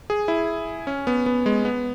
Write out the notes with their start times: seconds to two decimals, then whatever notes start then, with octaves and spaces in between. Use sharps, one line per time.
0.10 G#4
0.28 E4
0.87 C#4
1.07 B3
1.26 B3
1.46 G#3
1.65 B3